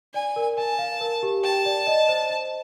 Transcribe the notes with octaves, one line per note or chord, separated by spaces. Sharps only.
D5 G#5
A#4
G#5 A5
F5
A#4
G4
G5 A5
D5
D#5
C5
C5